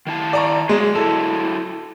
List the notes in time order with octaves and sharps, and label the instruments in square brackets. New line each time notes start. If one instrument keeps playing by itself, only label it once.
[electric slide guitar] D#3 E4 A5
[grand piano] D5 A#5 C#6
[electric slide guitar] F#3 G#4 [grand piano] G#3
[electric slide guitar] F#3 E4 [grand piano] A4